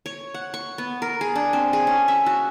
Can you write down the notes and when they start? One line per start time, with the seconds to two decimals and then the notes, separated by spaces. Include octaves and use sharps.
0.06 C#5
0.34 F#5
0.54 C#6
0.78 B3
1.02 A#4
1.21 G#4
1.35 D4
1.53 C4
1.73 G#4
1.87 C#4
2.08 E5
2.26 F#4